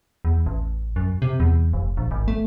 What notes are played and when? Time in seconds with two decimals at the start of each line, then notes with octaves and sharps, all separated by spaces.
0.25 E2
0.46 A1
0.96 F#2
1.22 C3
1.40 E2
1.73 F1
1.97 A#1
2.11 G#1
2.28 A3